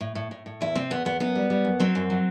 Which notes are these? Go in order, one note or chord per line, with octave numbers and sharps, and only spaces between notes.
A2
A2
A2
A2
E2 E4
C3 C4
E2 B3
E2 B3
F#2 B3
G3
G3
F#2
F#3 C4
F#2
F#3